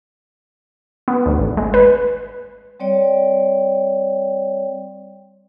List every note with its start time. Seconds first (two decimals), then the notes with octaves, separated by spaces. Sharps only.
1.08 B3
1.26 D2
1.39 G#1
1.57 G#3
1.74 B4
2.80 G3 C4 C#5 D5 G5